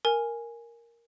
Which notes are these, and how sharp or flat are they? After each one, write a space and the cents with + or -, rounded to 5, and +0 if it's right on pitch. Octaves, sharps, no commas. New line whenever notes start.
A#4 +0 G#5 +0